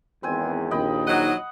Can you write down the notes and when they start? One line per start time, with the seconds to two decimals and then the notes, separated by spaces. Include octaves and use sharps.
0.23 G#1 E2 C4 C5 G#5
0.71 A#1 D#2 D#5 G5 B5
1.07 F#3 D#4 D#5 F#5